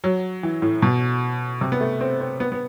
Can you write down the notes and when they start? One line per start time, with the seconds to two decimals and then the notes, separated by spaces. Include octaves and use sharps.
0.04 F#3
0.43 E3
0.62 A2
0.82 B2
1.61 C3
1.72 B3
1.80 A3
2.01 C4
2.20 C4
2.40 B3
2.52 B3